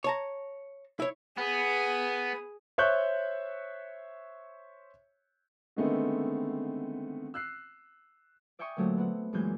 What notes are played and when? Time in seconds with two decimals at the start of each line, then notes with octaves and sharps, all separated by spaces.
0.04 C#5 A5 A#5
1.00 E4 C#5
1.38 B3 G#4
2.78 C5 C#5 E5 C#6 F#6 G6
5.76 D3 D#3 G#3 A3 B3 C4
7.34 E6 F#6 C7
8.59 D5 E5 G5 G#5 C#6 D#6
8.77 A#2 D3 F#3 A3 C4
8.98 B3 C4 F#5
9.33 F#2 A#2 E3 G#3 G#5 G6